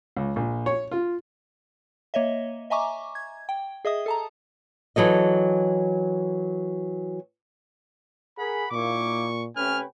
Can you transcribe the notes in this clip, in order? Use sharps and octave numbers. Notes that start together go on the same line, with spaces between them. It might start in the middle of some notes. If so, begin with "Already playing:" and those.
C#2
A#1
C#5
F4
A#3 C#5 D#5 E5
D#5 E5 G#5 A#5 C#6 D6
G#6
G5
G#4 D#5 E5 D#6
A4 A5 A#5
E3 F#3 A4 D#5
G#4 A#4 F#5 B5
A#2 A#3 D#4 E4 C#6 D6
C3 A3 C#4 B4 G5 G#5 F6